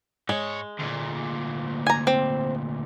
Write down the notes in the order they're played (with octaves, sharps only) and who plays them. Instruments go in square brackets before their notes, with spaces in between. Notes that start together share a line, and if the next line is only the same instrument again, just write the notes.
[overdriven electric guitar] G#2 C#5 [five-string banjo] G#3
[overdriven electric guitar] D2 A#2
[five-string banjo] G#5 A#5
C4